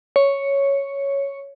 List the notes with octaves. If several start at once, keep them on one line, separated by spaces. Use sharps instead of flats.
C#5